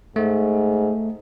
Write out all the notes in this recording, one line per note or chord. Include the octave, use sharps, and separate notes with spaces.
G#2 A3